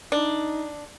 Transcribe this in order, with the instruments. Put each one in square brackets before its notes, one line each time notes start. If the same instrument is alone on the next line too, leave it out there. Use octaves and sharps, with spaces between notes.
[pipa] D4 [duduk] D#4